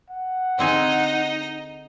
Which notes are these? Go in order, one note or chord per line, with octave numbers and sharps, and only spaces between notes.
F#5
D3 C4 D#4 G#4 D#5